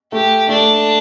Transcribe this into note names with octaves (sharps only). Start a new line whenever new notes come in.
A3 G4
A3 D4